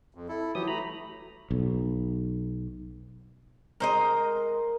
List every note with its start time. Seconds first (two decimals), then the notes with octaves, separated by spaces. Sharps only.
0.15 F2
0.29 E4 A4
0.55 E3 F#3 G4 D#6
0.68 A3 A#5 B5
1.51 B1
3.80 G#3 A#4 C5 D#5